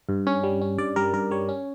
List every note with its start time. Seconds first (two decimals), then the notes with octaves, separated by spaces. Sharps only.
0.09 G2
0.27 C#4
0.43 G3
0.61 C#4
0.78 G2 D5
0.96 G3 A#4
1.14 G2 A#4
1.31 G3 C#5
1.49 C#4